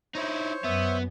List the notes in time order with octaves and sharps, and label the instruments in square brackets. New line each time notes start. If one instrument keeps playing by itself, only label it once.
[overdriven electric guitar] D#4 E4 [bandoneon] C5 C#5
[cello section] F#2 [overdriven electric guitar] B3 [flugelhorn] E5